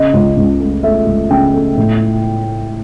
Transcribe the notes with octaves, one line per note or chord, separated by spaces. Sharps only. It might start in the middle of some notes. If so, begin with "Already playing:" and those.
Already playing: C#3 D#5
C#2
C#2
A3
A3 E5
C#2
C#3 G5
A3
A2